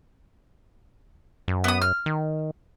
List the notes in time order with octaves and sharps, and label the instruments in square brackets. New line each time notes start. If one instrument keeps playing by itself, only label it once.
[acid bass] F#2
[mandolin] B3 D#6
F6
[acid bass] D#3